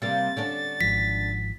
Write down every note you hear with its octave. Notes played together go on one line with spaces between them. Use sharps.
C3 G3 A#3 A6
D3 C#4 D4
G#1 G#2 F3 B6